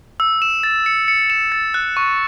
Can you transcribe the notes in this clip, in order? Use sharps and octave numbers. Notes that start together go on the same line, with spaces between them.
E6
E7
A6
C#7
C#7
E7
A6
F#6
C#6